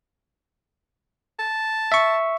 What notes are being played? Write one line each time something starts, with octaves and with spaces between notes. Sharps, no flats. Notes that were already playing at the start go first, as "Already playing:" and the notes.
A5
E5 C#6